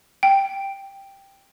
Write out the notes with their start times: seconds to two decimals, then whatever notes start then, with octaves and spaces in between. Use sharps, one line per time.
0.23 G5